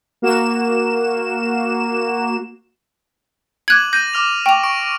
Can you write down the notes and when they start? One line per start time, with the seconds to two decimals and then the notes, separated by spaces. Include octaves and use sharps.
0.22 A#3 F#4 E7
3.68 D6 F#6 G#6 D#7 F#7
3.93 G6 A#6 D#7
4.14 D6 F6 F7
4.46 G5 C#6 D6 F7
4.63 C#6 D7